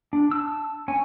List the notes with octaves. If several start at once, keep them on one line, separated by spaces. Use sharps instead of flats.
D4
A5 E6
C#4 G#5